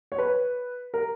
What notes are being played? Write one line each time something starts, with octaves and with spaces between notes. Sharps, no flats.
C#5
B4
A#4